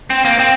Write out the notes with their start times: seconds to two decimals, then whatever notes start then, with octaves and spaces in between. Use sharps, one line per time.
0.10 C4
0.25 A#3
0.39 C4